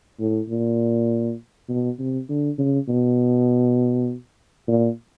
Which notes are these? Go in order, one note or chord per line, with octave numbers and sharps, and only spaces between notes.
A2
A#2
B2
C3
D3
C#3
B2
A#2